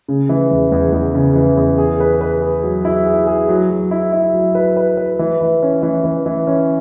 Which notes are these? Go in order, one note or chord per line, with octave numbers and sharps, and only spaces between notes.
C#3
E3
E2
E2
E2
C#3
E3
E2
G#4
B4
B4
G#4
F#3
E4
G#4
G#4
F#3
F#3
E4
E4
F#3
B4
B4
B4
E3
E3
C#4
E3
E3
E3
C#4